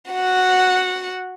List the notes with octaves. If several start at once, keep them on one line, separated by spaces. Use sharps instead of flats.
F#4 F#5